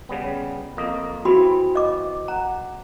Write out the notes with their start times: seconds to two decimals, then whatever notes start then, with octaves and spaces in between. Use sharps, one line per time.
0.09 C#3 G3 B3
0.77 F2 A#3 D#5
1.25 E3 C4 F#4 B5
1.75 D#5 D6
2.28 F#5 A#5